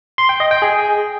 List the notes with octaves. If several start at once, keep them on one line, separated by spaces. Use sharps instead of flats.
C6
G5
D#5
G5
G#4